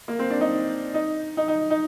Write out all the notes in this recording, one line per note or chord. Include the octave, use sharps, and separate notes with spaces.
A#3
C4
D4
D#4
D#4
D#4
D#4
D#4